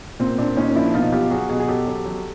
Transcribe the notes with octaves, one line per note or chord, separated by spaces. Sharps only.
A#2 C4
A#2 C4 D4
A#2 C#4 D#4
F3 D4 E4
B2 D#4 F4
F#3 F4 G4
F#3 F#4 G#4
B2 F#4 G#4
G#4
F#3 G4 A4
F#3
F#3